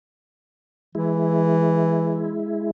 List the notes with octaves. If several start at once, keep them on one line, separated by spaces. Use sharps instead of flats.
E3 G#3 E4